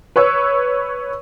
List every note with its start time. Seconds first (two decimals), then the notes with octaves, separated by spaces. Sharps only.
0.16 B4 C#5 C#6 E6